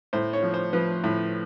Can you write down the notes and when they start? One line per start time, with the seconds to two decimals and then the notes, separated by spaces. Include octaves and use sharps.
0.13 A2 C5
0.33 C#5
0.43 F3
0.54 C5
0.73 F3 B4
1.04 A2